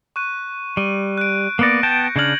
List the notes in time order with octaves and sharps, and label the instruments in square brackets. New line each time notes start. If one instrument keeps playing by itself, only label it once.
[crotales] C#6 F#6 D#7
[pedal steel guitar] G3 [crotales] D#7
[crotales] F#6 D7
[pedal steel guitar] A#3 B3 D5 [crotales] A#6 C#7 D7
[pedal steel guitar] B3 G5 A5 [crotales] G6
[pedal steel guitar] C#3 D4 F6 [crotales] F#6 G#6 F#7